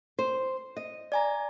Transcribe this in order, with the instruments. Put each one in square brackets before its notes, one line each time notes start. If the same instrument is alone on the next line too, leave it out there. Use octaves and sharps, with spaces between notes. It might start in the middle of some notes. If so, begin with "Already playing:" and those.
[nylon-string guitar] C5
D#5
[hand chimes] D5 G#5 A#5